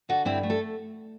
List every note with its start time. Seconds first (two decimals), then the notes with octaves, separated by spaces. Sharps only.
0.09 D3 F#4 A4
0.25 G2 C4 E4
0.43 A3
0.50 A4